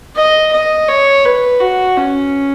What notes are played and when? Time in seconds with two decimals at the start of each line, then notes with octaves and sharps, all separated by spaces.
0.16 D#5
0.53 D#5
0.89 C#5
1.25 B4
1.60 F#4
1.97 C#4